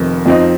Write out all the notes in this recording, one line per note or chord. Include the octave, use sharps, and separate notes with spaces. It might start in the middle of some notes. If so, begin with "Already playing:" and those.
Already playing: F1 F2 D#3 C4
F2 F3 C4 D#4